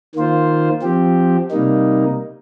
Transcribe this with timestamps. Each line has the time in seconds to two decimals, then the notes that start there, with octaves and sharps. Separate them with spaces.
0.15 D#3 A#3 F4 C5
0.82 F3 C4 G4
1.51 C3 G3 A#3 D#4